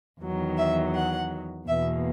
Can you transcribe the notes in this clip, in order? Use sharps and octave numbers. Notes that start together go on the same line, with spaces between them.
E2 D#3 F#3
E5
F#5
E2 B2 A#3 E5